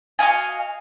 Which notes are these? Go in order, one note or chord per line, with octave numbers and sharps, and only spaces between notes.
F#4 D#5 F5 G#5